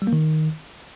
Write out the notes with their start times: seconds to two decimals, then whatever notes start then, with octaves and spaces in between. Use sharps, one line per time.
0.02 G3
0.07 A#3
0.13 D#3